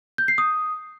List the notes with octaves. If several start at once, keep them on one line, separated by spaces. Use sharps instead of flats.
G6
C7
D#6